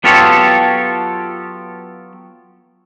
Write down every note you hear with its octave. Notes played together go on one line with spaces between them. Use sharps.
F#3 B3 F4 G4 A4 C#5